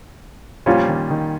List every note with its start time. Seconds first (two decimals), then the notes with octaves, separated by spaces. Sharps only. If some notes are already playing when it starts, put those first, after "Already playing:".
0.66 A#2 F3 G3 C#4 F4
0.88 D#3
1.10 D#3